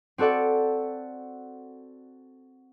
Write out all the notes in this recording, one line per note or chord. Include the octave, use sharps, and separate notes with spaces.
C4 F#4 A4 D5 F#5